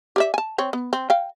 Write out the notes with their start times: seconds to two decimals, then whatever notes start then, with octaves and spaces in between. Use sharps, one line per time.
0.16 G4 D5 E5
0.34 G#5 A5
0.58 C4 C#5
0.73 B3
0.93 C4
1.10 F5 G5